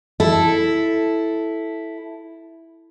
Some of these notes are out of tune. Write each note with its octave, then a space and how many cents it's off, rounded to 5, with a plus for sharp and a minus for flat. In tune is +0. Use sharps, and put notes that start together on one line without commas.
E4 +0 A4 -5